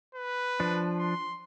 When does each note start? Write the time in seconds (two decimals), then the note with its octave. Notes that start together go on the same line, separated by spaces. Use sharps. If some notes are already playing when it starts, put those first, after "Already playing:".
0.15 B4
0.60 F3 D4
0.99 C6